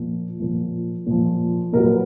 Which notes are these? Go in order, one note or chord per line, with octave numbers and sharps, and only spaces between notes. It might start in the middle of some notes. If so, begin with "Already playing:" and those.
Already playing: A#2 F3
A#2 F3
A#2 F3
A#2 F#3 A#4
B4